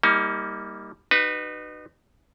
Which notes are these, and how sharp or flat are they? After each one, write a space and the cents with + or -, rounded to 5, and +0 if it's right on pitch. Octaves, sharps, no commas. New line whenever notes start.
G3 +10 A#3 -5 D#4 +35
D#4 -35 F#4 +30 B4 +0